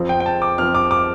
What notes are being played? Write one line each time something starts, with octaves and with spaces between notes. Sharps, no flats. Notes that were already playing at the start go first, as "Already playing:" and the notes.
Already playing: F2 F3 C4
G5
G5
A5
D6
F2 F3 C4 F6
D6
D6